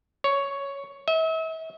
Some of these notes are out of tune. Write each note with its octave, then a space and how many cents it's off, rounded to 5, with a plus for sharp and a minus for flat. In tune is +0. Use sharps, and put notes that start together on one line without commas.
C#5 +5
E5 -40